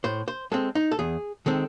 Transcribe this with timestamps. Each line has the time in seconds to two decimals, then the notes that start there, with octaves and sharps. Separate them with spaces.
0.04 A2 C5
0.28 C5
0.52 G#3 C4 A4
0.75 D#4
0.91 A4
0.99 E2 G#4
1.46 D#3 G#3 C4 A4